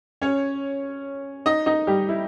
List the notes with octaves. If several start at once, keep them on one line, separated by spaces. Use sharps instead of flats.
C#4 C#5
D#4 D#5
D#4 D#5
G3 G4
E4